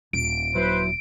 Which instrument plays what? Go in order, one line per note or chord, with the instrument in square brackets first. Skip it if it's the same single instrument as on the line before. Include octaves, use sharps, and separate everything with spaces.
[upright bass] D#1 [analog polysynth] D7
[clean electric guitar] F#3 E4 [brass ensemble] B4 C5